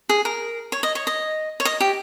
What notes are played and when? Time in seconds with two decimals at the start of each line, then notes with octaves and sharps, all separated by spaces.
0.09 G#4
0.25 A#4
0.72 C#5
0.83 D#5
0.95 C#5
1.07 D#5
1.60 C#5
1.65 D#5
1.80 G4